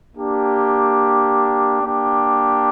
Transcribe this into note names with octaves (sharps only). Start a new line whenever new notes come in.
A#3 D4 G4
A#3 D4 G4